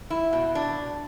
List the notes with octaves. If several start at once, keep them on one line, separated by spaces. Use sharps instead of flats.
E4
B2
D4